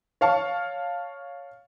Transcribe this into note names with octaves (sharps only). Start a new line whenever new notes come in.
C#5 F5 A5 C#6